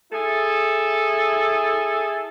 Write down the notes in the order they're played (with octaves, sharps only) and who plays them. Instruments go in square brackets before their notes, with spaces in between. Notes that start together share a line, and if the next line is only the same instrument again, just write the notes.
[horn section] E4 G#4 A4